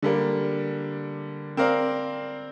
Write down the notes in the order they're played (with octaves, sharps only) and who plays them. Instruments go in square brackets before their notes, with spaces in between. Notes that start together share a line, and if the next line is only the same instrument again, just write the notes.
[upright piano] D3 G3 A#3 D4
C4 A#4 D5 F5